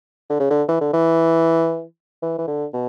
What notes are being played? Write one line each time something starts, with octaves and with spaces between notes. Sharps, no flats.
D3
C#3
D3
E3
D3
E3
E3
E3
D3
B2